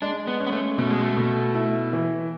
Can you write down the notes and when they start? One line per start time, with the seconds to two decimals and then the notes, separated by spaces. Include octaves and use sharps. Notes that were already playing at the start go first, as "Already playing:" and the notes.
0.02 G#3 D4
0.27 B3
0.40 C#4
0.47 B3
0.52 A3
0.78 B2 A3
0.90 G#3
1.00 A3
1.17 B2
1.54 E4
1.93 E3